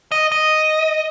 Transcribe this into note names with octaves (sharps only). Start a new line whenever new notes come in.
D#5
D#5